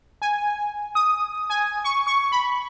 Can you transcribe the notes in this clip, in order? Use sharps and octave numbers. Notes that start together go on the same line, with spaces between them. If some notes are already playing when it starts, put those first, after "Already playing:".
G#5
D#6
G#5
C#6
C#6
B5